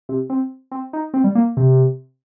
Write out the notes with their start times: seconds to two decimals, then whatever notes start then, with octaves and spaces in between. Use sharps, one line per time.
0.09 C3
0.30 C4
0.72 C4
0.93 D#4
1.14 C4
1.24 G3
1.35 A#3
1.57 C3